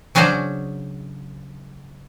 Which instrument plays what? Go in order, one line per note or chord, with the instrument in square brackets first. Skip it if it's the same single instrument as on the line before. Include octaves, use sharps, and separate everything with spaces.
[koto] C#3 F#3 C#4 D4 C5 F#5